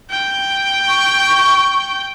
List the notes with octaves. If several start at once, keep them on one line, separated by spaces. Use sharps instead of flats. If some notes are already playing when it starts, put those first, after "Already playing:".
G5
C#6